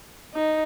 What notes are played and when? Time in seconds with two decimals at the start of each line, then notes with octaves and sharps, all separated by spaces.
0.34 D#4